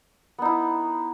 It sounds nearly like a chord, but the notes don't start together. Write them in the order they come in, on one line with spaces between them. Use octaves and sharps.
B3 D#4 E4